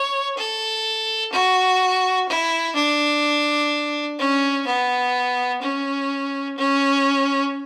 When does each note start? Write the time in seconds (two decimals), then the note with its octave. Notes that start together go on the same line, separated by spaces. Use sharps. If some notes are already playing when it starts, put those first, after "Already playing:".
Already playing: C#5
0.37 A4
1.33 F#4
2.29 E4
2.76 D4
4.19 C#4
4.67 B3
5.62 C#4
6.58 C#4